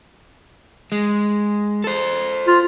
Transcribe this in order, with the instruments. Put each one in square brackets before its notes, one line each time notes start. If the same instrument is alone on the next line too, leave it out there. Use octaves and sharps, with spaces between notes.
[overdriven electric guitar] G#3
A4 C5
[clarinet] F4